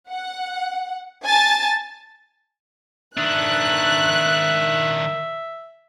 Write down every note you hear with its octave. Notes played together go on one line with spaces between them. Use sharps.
F#5
G#5 A5 A6
D#3 D4 E5 F#6